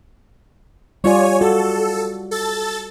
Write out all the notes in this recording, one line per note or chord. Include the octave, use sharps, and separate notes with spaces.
G3 F4 C#5 D5 G#5
F#4 A4
A4 A6